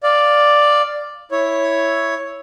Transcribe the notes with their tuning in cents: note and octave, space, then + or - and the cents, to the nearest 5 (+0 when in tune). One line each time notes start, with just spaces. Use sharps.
D5 +0 F5 +0
E4 +0 C#5 +0